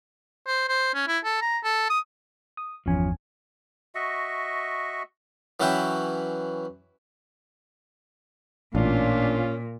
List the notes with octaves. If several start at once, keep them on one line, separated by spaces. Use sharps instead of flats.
C5
C5
C#4
E4
A4
A#5
A4
D#6
D#6
G1 E2 F3 C#4 G#5
F#4 D#5 E5 C#6
E3 F#3 C#4 B4 E5 G5
A1 A#2 C#4 D4 F4